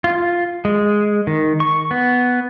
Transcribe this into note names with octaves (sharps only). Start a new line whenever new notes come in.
F4
G#3
D#3
C#6
B3